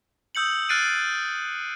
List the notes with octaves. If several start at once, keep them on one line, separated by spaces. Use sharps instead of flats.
D#6 E6 G6 C#7 F#7
F6 F#6 A6 C7 D7 D#7